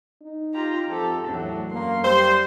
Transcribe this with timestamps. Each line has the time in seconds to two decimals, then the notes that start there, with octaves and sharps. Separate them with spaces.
0.22 D#4
0.54 F4 G4 A#5
0.88 F2 C4 G4 A4
1.28 E2 A2 F#3 D4
1.72 F#2 A#3 C6
2.04 G3 C5